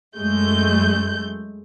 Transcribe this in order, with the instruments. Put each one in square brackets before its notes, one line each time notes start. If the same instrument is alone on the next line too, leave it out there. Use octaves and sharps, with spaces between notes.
[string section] F#2 G#3 A3 G6